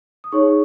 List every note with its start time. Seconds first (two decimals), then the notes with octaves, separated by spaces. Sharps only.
0.24 D#6
0.32 D#4 G#4 C#5 C#6